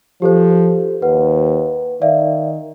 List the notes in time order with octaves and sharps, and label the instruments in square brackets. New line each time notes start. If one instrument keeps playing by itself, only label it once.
[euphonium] F3 [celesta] G4 A4 C5
[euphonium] D#2 [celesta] B4 F#5
[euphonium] D#3 [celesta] D5 E5 F5